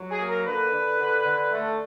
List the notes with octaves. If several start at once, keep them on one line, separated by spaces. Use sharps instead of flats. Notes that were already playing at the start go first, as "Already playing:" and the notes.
Already playing: F#3
G#4
A#3
A#4
D3 B4
D3
D3
D3
A3